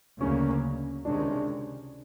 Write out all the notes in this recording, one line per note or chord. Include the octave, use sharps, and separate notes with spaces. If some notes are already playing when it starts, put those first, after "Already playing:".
D2 C#3 F#3 A#3 C#4
C#2 C3 D#3 G#3 C#4 D4